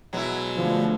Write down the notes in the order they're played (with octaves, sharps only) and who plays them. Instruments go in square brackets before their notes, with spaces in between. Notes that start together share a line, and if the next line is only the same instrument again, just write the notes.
[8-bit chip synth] B2 G#3 [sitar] F#3 E4
[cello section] D3 A3 [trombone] F3